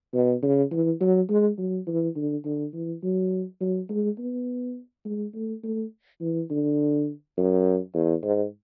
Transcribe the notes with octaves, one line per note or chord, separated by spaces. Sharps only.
B2
C#3
E3
F#3
G#3
F#3
E3
D3
D3
E3
F#3
F#3
G#3
B3
G#3
A3
A3
E3
D3
F#2
E2
G#2